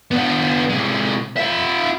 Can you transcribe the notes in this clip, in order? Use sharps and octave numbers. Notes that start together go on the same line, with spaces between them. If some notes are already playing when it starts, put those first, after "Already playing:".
B3 D4
C3 G#3
F4 E5